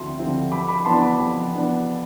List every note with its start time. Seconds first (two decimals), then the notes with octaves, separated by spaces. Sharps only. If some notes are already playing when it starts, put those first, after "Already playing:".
Already playing: D2 D3 F3 C4 E4 C6
0.18 D3 F3 C4 E4
0.52 F2 B5 D6
0.68 B5 D6
0.85 E3 B3 D4 A5 C6
1.02 B5 D6
1.20 F2
1.52 E3 B3 D4